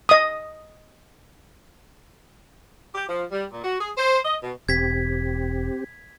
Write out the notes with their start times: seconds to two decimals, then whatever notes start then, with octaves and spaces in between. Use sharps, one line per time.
0.09 D#5 D#6
2.95 G4
3.09 F3
3.32 G3
3.52 A#2
3.64 F#4
3.81 G#4
3.98 C5
4.25 D#5
4.43 B2
4.69 E1 C4 G4 G#6 B6